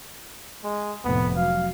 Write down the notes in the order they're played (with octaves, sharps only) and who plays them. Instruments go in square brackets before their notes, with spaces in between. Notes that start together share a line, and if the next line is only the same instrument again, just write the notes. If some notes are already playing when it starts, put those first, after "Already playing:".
[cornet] G#3
[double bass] F1 A2 [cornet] B3
[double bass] F#3 [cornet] F5